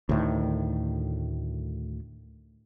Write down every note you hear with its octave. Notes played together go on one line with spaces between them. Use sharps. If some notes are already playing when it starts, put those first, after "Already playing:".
D2 A2 D#3